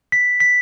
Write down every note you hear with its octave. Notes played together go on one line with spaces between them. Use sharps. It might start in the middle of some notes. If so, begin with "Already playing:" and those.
B6
B6